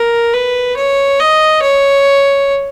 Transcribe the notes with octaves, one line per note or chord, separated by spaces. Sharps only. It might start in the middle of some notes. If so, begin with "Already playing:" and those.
Already playing: A#4
B4
C#5
D#5
C#5